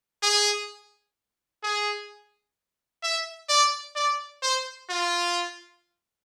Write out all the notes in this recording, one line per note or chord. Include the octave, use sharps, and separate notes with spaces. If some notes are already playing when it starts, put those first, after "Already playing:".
G#4
G#4
E5
D5
D5
C5
F4